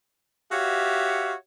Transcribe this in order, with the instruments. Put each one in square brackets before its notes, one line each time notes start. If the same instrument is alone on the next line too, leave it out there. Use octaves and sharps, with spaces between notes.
[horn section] F#4 G4 C#5 E5 F5